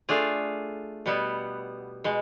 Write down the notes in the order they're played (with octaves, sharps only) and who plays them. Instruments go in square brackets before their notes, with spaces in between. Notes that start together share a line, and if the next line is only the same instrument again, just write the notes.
[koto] A3 D4 F4 G#4
B2 G3 B3
B2 G#3